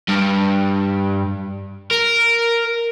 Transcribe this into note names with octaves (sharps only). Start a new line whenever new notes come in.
G2
A#4